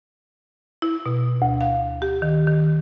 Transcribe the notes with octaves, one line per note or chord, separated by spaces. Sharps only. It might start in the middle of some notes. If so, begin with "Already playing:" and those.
E4
B2
D2
F5
G4
D#3
D#3